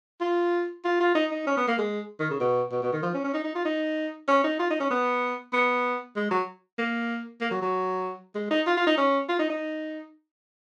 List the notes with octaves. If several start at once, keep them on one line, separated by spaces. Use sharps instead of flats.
F4
F4
F4
D#4
D#4
C#4
B3
A#3
G#3
D#3
C#3
B2
B2
B2
D#3
F3
C#4
C#4
D#4
D#4
F4
D#4
C#4
D#4
F4
D#4
C#4
B3
B3
G#3
F#3
A#3
A#3
F#3
F#3
G#3
D#4
F4
F4
D#4
C#4
F4
D#4
D#4